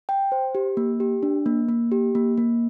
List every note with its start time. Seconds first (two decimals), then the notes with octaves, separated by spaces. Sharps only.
0.09 G5
0.32 C5
0.55 G4
0.77 A#3
1.00 G4
1.23 D4
1.46 A#3
1.69 A#3
1.92 G4
2.15 A#3
2.38 A#3